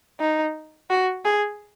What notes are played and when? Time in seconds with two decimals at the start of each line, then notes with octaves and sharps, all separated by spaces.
0.20 D#4
0.90 F#4
1.25 G#4